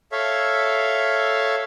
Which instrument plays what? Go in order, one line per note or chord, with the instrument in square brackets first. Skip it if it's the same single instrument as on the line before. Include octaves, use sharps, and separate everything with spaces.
[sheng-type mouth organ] A4 C#5 E5 F5